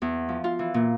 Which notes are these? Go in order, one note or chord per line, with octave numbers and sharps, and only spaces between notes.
E2
F3
F4
E3
A#2